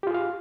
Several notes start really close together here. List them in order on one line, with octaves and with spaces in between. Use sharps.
G4 F4 G#4 F5